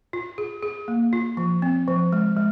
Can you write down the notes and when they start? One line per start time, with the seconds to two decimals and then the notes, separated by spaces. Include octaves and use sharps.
0.13 F4
0.38 G#4
0.63 G#4
0.88 A#3
1.13 F4
1.37 F3
1.62 C4
1.88 F3
2.13 G#3
2.37 G#3